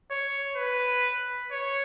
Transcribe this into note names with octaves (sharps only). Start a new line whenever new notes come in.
C#5
B4
C#5